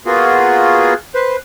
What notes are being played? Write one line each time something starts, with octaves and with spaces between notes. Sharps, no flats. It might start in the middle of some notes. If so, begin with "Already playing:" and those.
A#3 B3 F4 F#4 G#4
B4 C5